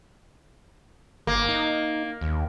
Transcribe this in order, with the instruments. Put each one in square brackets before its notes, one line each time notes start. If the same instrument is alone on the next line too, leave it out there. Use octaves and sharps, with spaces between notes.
[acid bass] G1 [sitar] A#3
[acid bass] D#4
D#2